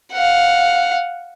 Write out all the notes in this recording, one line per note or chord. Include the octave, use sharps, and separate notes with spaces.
F5 F#5